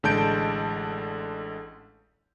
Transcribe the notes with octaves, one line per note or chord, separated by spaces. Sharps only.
A1 D3 G#3 A5 G6 D7